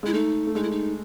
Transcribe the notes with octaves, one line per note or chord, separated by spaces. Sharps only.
G#3 E4
A3 D#4
A3
G#3 D#4
E4
D#4